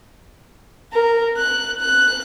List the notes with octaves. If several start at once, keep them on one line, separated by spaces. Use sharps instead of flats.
A#4
F#6
F#6